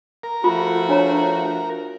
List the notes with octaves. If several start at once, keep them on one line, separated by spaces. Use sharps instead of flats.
A#4
F3 A3 F4 F#4
D4 C#5 A#5